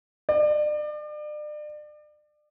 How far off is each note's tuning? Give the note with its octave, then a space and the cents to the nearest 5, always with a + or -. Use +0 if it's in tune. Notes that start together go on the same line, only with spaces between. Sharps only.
D5 +35